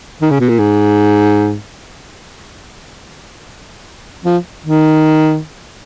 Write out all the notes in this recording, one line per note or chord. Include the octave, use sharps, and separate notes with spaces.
D#3
C#3
B2
A#2
G#2
F3
D#3